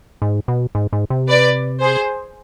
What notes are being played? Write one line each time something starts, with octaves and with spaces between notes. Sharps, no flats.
G#2
B2
G#2
G#2
C3
B4 D5
G#4 C5